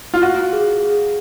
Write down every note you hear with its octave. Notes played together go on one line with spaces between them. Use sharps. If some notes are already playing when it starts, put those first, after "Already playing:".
F4
F#4 F5
G#4
G#4